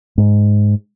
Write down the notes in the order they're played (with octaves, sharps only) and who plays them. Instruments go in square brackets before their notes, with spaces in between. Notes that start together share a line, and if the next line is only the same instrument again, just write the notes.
[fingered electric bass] G#2